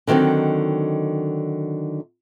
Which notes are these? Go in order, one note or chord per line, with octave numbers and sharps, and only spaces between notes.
D3 D#3 F#3 C4 D#4